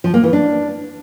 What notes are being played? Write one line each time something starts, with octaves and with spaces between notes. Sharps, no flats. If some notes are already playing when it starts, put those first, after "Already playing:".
F3
A#3
E3
D4